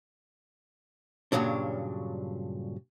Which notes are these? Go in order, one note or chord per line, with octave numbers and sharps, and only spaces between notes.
G2 A#2 C#3 F#3 D4